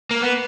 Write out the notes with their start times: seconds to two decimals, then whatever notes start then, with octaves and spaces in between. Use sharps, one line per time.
0.11 A#3
0.22 B3